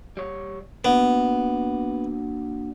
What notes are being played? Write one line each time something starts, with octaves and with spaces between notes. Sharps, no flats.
G3 C#5
A#3 B3 D4 F#4